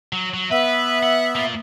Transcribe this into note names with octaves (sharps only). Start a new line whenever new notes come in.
F#3
F#3
B3 B4 E5
F#5
A#3 F4